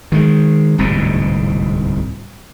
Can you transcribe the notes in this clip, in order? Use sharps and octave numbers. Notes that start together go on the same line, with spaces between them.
D#3 G#3
D1 C2 G#2 B2